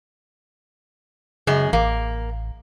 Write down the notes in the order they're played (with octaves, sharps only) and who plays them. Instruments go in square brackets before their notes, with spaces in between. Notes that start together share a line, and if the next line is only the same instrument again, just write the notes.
[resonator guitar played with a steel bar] F#2 G#3 [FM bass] C#3
[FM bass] A1 [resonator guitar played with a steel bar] A#3